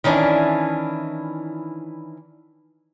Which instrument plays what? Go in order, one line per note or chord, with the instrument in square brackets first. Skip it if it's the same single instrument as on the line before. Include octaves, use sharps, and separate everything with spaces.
[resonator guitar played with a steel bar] D#3 E3 C#4 D4 E4